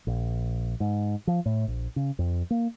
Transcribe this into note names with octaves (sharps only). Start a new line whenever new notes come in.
A#1
G#2
F3
A2
A#1
C#3
F2
A#3